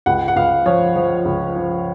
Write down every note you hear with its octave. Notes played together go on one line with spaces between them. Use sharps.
C#2 F#5
F#5
C#2 F5
F3 C#5
F3
C#2
F3